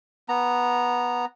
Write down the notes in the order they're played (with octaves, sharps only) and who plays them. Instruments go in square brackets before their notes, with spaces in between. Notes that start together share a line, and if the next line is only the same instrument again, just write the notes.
[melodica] B3 A#5